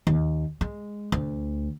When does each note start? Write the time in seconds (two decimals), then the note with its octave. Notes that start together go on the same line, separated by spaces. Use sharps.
0.07 D#2
0.61 G#3
1.12 D2